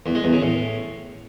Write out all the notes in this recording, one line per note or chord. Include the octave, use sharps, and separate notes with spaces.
E2
G#3
E2
C#3
A2